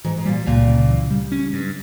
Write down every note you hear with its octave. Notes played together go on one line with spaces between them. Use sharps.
G#2 E3
G#2
A#2 G3
C#2 A#2
C#3
E3
G3
C#4
G2